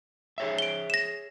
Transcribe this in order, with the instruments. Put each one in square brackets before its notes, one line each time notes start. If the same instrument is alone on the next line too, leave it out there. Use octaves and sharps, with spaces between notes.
[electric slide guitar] G#4 C#5 E5
[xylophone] D7 G7
A#6 E7